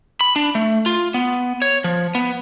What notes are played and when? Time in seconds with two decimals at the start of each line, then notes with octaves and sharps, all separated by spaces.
0.21 B5
0.36 D4
0.55 A3
0.86 F4
1.14 B3
1.62 C#5
1.84 F3
2.15 B3